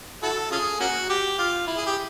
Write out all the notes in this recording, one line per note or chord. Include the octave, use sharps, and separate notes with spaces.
E4 F#4 A4
C#4 F4 G#4
A#3 C#4 F#4
G4
F4
E4
G#4
G4